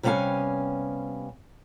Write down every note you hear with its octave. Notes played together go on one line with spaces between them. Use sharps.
C3 G3 B3 C#4 F5 G#5